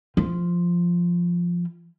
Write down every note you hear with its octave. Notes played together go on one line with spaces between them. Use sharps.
F3